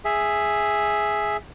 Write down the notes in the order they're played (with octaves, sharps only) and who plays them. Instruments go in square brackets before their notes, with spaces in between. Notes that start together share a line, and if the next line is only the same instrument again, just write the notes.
[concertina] G#4 E5